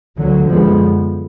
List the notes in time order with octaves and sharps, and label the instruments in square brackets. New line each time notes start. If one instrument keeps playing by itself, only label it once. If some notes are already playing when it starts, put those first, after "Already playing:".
[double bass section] D2 D3 F#3
F#2 D3 F3 G#3 B3